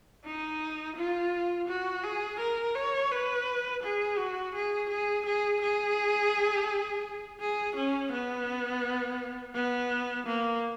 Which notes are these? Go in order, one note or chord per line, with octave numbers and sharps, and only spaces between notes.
D#4
F4
F#4
G#4
A#4
C#5
B4
G#4
F#4
G#4
G#4
G#4
G#4
G#4
C#4
B3
B3
A#3